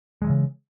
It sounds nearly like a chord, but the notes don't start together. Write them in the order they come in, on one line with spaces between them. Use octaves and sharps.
G#3 F#3 E3 C#3